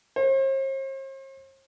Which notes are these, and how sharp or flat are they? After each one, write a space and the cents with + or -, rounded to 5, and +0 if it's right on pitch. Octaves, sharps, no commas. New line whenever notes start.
C5 +45